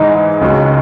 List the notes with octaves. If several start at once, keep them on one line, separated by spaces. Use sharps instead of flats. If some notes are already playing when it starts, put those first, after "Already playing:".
Already playing: G#2 E3 G#3 D#4
C#2 C#3 G#3 C#4 F#4